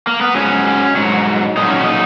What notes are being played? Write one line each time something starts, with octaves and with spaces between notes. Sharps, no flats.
A#3
B3
G#2 F#3 C#4
G#2 F#3
A#2 F#3 D#4
C#4
D#4